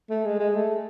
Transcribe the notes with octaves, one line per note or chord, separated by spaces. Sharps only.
A3
G#3
G#3
A3